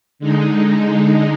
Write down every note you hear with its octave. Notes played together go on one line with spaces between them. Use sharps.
D3 G#3 D#4